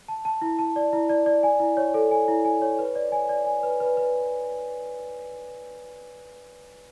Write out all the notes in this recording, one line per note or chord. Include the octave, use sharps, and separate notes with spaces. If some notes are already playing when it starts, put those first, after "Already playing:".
A5
A5
E4
A5
D5
E4
D5
D5
G#5
E4
C#5
A4
G#5
E4
G#5
C#5
B4
D5
G#5
D5
G#5
B4
B4
B4